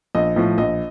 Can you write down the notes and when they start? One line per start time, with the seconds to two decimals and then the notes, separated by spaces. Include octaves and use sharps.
0.15 A#1 D#5
0.36 A2 F3
0.58 A#1 D#5